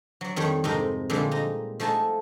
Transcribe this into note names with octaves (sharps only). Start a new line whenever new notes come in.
F#3 D5
F2 D#3 G3 C#5
F2 G#2 C3 D#4 A#4
A#2 D3 F3 G3 G#3
D#4 A#5
F3 A3 D#4 G#5 A5